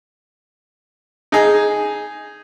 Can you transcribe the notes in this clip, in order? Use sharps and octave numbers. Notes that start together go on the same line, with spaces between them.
D#4 G#4